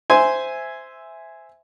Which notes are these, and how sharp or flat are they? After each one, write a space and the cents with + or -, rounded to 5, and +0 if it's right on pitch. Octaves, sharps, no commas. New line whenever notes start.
C5 -10 E5 +0 G#5 +0